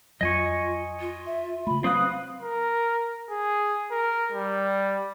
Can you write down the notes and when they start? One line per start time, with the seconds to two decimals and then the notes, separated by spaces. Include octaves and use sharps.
0.21 F2 F#3 F4 D#5 G#5 C#6
1.00 F4
1.26 E5
1.67 C#3 A3 B5
1.84 F#3 C4 B4 F5 D#6 F#6
2.42 A#4
3.30 G#4
3.92 A#4
4.32 G3